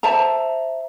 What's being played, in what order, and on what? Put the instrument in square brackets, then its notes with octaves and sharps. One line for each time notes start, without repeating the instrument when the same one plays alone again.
[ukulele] C5 E5 A5 A#5